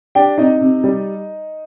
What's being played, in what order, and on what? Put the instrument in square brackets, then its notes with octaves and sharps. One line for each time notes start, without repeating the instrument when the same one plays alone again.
[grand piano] D4 G4 G5
C3 D#4 D#5
C3
G3